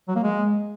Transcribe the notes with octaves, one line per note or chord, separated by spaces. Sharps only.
F#3
A#3
G#3